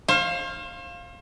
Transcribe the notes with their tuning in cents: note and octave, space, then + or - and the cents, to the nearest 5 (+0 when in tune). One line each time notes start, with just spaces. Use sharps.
C5 +40 F5 +0